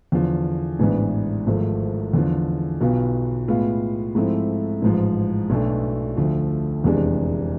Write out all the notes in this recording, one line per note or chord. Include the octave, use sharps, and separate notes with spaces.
E2 D3 F3
A1 G#2 E3 B3 D4
G#1 G#2 F3 A3
E2 D3 F3
B1 B2 B3 F4
A2 G#3 B3 F4
G#2 F3 A3 C4 E4
A1 G#2 F3
B1 B2 A3 D4
D2 D3 F3 A3
F1 E2 C3 G#3 D4